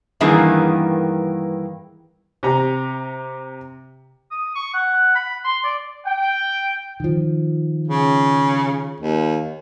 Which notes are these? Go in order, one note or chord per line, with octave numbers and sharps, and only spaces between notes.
G2 D#3 E3 A#3 B3 G#4
C3 A#5
D#6
C#6
F#5
B5
C6
D5
G5
D#3 F3
C#3
D#2